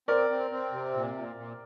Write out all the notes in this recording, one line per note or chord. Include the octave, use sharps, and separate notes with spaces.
C4 A#4 D5
C4
C4
C3
A#2
A#2
A#2